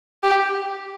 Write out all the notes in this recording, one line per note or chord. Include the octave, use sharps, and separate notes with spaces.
G4